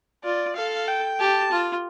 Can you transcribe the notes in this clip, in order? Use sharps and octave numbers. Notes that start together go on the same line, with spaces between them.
F4 D5
A4 F5
G5
G4 A5
F4